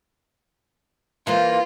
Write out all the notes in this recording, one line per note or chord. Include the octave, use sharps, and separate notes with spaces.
E3 A#3 F4 C5